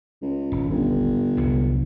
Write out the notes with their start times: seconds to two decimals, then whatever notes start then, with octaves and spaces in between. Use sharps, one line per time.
0.22 C#2
0.52 D#1 G#1
0.69 G1
1.37 C2 F2 F#3